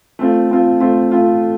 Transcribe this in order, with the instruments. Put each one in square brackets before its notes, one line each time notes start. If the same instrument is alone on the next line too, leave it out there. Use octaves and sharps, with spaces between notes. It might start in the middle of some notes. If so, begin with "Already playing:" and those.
[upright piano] A3 C4 F4
A3 C4 F4
A3 C4 F4
A3 C4 F4